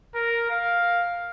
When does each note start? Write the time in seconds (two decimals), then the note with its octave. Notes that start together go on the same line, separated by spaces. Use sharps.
0.15 A#4
0.50 F5